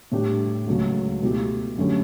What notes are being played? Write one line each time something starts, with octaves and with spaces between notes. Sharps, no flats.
A2 G3 D4 G4
C#2 C#3 F#3 A3
B2 A3 E4 G4
F#2 D3 A3 C#4 G4